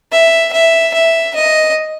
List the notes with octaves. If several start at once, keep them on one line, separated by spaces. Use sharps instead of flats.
E5
E5
E5
D#5